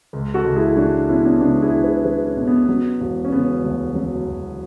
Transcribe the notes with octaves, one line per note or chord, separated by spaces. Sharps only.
C#2
F#4 A4
C#2
E4 G#4
F#3 D4 F#4
B2 C#4 E4
B3 D4
C#2 B3 D4
E4 G#4
C#2
G#4 B4
F#3 G#4 B4
C#4
B2
B3
F#3
E1
C#4
C#3 B3
D2
F#3
E1